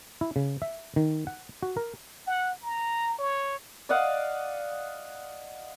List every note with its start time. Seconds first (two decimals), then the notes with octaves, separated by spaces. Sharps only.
0.21 E4
0.36 C#3
0.62 E5
0.96 D#3
1.27 F#5
1.63 F#4
1.77 A#4
2.27 F#5
2.63 A#5
3.19 C#5
3.89 D5 D#5 F5 F#5